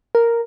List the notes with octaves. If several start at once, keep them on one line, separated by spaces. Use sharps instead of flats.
A#4